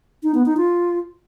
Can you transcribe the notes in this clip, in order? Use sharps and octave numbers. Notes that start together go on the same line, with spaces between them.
D#4
B3
D#4
F4